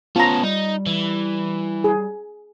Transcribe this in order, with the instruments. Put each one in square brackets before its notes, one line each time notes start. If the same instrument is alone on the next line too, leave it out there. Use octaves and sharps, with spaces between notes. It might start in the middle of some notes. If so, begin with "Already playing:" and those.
[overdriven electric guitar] B3 C#4 [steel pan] F4 A#5 [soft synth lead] A5
[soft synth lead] G3 [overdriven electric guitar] D#4
[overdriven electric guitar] E3
[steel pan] G#4